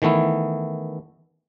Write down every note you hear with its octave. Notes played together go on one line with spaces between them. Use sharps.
D#3 E3 A3 B3 E4